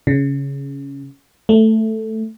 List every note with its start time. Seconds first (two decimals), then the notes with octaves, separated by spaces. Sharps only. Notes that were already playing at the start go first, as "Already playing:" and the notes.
0.07 C#3
1.49 A3